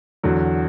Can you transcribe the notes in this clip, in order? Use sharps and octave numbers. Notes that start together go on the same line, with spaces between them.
E2 D3 F#3